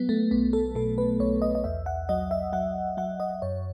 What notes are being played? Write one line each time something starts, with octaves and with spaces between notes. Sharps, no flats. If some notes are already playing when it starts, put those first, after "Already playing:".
Already playing: F#3 B3
A3
B1 B3
A4
B2 A4
B4
B1 C#5
D#5
D#5
E2 E5
F#5
F#3 D#5
E5
F#3 F#5
F#3 F#5
D#5
F#2 C#5